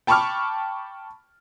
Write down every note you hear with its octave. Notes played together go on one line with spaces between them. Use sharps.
G5 A5 B5 C#6 D6 F6